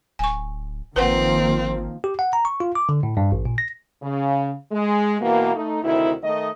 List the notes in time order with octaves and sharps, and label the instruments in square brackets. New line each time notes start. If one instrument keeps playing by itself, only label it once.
[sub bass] D1 [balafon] G#5 C#6
[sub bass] G#1 [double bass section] D#3 F3 A#3 [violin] C4 [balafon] B4 C5 F#5
[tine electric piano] G4
F#5
A#5
C#6
F4
D6
D3
A2
G2
A1
A#2
A#6
[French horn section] C#3
G#3
B2 E3 A#3
A3 D#4
D2 C3 D#3 E4
D#3 A3 D#5